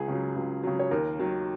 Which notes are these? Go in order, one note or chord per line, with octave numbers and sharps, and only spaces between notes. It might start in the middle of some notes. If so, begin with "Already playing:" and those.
Already playing: C#2 G#4
C#3 F#3
C#2
C#3 F#3
C#5
D#2 A#4
D#3 F#3